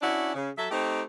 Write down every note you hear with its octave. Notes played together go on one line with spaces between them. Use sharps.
C#4 D4 E4 F#4
C#3
F#3 A4 E5
A3 C4 D#4 G4